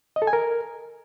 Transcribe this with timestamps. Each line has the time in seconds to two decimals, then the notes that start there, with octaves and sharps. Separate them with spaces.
0.16 D#5
0.22 A4
0.27 G#5
0.33 A#4